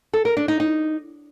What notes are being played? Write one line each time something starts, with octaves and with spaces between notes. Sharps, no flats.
A4
A#4
D4
D#4
D#4